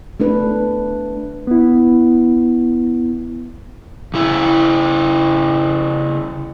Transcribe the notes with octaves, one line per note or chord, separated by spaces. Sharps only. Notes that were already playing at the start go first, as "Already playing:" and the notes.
A3 D4 B4
B3 E4
C#3 E4